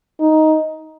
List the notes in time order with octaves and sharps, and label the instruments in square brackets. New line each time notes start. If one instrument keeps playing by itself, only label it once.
[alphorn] D#4